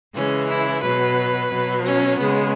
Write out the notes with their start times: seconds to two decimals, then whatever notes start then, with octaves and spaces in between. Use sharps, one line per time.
0.14 C#3 E3 G#3 C#4
0.48 E4
0.82 B2 F#3 B4
1.51 B2 F#3
1.85 C#4
2.19 C#3 G#3 B3